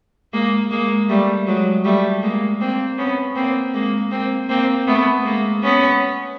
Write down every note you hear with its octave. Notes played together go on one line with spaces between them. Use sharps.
G#3 A#3
G#3 A#3
G3 A3
F#3 G#3
G3 A3
G#3 A#3
A#3 C4
B3 C#4
A#3 C4
G#3 A#3
A#3 C4
A#3 C4
A3 B3
G#3 A#3
B3 C#4